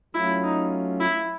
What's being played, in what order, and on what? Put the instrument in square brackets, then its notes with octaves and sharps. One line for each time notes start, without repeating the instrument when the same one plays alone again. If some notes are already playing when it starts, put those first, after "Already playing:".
[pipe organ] F#3 A3 C#4 F4 [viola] E4
[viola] D#4
E4